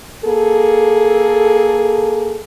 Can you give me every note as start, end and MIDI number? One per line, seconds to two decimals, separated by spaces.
0.25 2.40 58
0.25 2.40 68
0.25 2.40 69